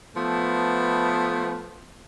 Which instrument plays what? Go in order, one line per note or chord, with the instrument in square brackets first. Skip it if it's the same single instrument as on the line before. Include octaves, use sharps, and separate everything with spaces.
[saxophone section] F3 A3 B3